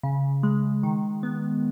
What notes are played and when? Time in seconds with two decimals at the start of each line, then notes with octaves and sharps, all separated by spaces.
0.03 C#3
0.43 G#3
0.83 D#3
1.23 B3